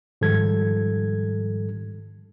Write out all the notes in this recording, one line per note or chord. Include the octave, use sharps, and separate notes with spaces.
G#2 D#3 F3 G3 A4 G#6